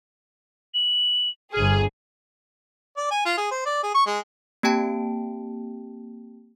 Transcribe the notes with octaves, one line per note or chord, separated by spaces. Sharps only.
F#7
G1 G#4 F6
D5
G#5
F4
G#4
C5
D5
G#4
C#6
G#3
A#3 C4 G4 G5 A5 D7